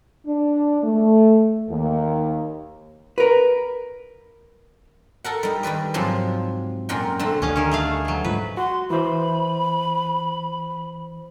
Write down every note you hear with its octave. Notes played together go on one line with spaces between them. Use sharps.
D4
A3
D#2
A#4 B4
A4 A#4 F#5
G3 D#4
D#3 G3 B4 D5
G#2 C3 F3 F#3
F#2 A#2 A#4 F#5 G5
D3 A3 C4
D2 D3 G3 C#4 D#5 F5
D#3 C#4
A3 G#4 F5
B2 F#3
G#2 F3 B4
F#4 C6
E3 C5 B5